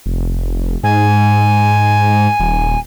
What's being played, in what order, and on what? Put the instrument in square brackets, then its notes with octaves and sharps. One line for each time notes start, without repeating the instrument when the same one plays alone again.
[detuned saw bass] F1
[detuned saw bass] G#2 [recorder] G#5
[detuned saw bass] D#1